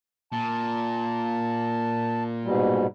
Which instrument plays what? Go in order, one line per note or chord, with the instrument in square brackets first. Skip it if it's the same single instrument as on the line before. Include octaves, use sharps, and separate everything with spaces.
[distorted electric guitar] A#2 [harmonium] A5
[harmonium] G#2 B2 G3